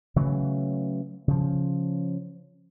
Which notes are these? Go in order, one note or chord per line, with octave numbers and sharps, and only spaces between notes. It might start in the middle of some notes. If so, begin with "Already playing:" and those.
C#3 E3 F#3 A3
C#3 F3